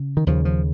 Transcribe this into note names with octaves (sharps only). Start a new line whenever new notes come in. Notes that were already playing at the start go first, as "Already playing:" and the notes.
Already playing: C#3
D#3
D#2 C#3 F3
F3